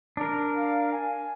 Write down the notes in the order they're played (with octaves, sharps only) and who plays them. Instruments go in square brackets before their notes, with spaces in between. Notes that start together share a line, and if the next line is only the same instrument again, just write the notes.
[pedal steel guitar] D4 A#4
[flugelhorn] F5
G#5